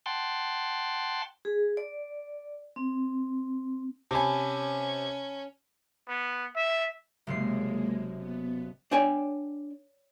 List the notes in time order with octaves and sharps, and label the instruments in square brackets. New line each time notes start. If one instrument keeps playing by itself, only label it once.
[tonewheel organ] F#5 G5 A5 C6
[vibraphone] G#4
D5
C4
[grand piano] C3 G#5 [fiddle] C#4 [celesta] A5 B5
[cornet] B3
E5
[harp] F#1 C3 C7 [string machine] G#3 A#3
[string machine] B3
[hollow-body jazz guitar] D4 G5 G#5 [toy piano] C#5 D5